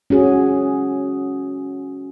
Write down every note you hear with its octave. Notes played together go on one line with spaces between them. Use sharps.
C#4 F#4 G#4